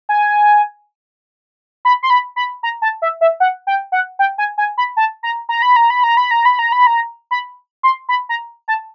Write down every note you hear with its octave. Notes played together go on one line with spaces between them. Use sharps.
G#5
B5
C6
B5
B5
A#5
A5
E5
E5
F#5
G5
F#5
G5
G#5
G#5
B5
A5
A#5
A#5
B5
A#5
B5
A#5
B5
A#5
B5
A#5
B5
A#5
B5
C6
B5
A#5
A5